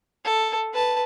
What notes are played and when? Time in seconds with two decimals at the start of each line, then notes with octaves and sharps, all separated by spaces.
0.25 A4
0.73 B4 A5